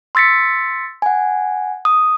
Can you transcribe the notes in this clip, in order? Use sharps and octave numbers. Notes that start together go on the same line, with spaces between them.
C6 E6 A6 B6 C#7
F#5 G#5
D#6